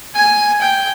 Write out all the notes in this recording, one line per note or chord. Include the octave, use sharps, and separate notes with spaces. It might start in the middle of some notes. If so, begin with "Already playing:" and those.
G#5
G5